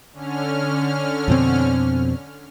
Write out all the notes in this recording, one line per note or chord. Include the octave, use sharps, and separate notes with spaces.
D3 C#4 F6
F2 B2 C4